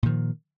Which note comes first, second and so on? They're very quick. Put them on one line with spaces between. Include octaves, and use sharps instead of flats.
A#2 D#3 F3